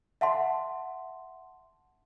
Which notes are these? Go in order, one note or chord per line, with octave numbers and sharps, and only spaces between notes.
E5 F#5 A5 C6